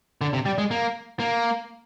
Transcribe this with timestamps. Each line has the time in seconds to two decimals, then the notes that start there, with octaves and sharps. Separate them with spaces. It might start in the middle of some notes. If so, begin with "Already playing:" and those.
0.21 D3
0.33 C3
0.46 G3
0.58 G#3
0.71 A#3
1.20 A#3